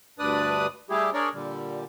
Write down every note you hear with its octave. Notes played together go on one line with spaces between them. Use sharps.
D2 G2 D4 B4 D5 D#6
G3 A3 E4 G4 G#4
D4 G#4 A#4 C#5 D5
A#2 D3 G3